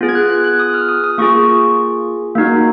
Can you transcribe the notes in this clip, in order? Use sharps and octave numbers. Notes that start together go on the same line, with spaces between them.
B3 F4 G#4
G#6
F#6
F#6
F#6
D#6
F6
D#6
D#6
A#3 F4 G#4 C#6
A#3 D#4 F#4